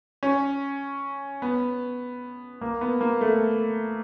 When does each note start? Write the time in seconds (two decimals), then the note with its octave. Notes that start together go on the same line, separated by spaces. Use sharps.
0.23 C#4
1.42 B3
2.61 A#3
2.81 B3
3.01 A#3
3.21 A3